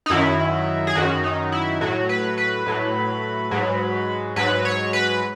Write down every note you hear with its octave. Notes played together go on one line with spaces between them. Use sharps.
D#4
F#2 D#3 F#3 E4
G#4
F#2 D#3 F#3 F#4
D#4
E4
A2 F#3 F#4
B4
B4
A2 F#3
G#2 F#3
G#2 F#3 B4
C#5
B4